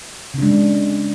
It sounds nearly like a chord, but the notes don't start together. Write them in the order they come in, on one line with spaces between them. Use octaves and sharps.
C#3 D4 G#3